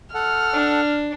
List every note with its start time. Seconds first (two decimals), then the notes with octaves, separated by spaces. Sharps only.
0.14 A4 F#5 F6
0.53 D4